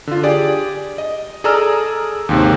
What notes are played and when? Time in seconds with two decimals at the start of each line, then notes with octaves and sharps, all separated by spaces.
0.07 D3 F4
0.23 G4 G#4 D5
0.98 D#5
1.44 G#4 A4 D5 A#5 E6 F6
2.29 D#2 G#2 C3